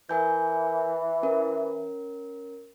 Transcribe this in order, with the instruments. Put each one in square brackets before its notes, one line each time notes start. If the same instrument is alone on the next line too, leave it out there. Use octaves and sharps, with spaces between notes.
[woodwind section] E3 [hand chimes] A#4 G#5 G6
[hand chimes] C#4 A#4